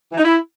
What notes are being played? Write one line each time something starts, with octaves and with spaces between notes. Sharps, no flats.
E3
D#4
E4